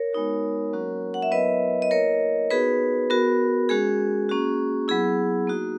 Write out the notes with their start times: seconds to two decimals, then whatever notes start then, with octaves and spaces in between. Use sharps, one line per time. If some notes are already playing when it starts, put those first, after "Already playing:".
Already playing: A#4 C#5
0.13 G#3 B3 D#4 F#4
0.73 F#3 A#3 C#4 F#4
1.14 F#5
1.22 E5
1.31 F#3 B3 E4 B4 D#5
1.82 D#5
1.91 A#3 E4 A#4 C#5
2.51 B3 D#4 F#4 G#4 B4
3.10 B3 F#4 A#4
3.69 G#3 C#4 F#4 G#4
4.29 A#3 C#4 F#4
4.88 F#3 B3 E4 G#4
5.47 A#3 D#4 F#4